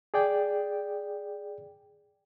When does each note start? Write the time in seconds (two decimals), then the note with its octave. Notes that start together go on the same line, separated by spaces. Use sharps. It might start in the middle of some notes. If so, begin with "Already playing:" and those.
0.14 G#4 D5 G5